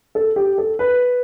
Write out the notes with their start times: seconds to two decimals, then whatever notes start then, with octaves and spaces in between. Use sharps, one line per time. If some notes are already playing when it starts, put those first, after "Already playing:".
0.15 A4
0.36 G4
0.58 A4
0.79 B4